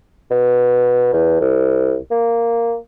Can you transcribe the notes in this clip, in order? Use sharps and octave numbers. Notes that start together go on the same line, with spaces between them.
B2
E2
C2
A#3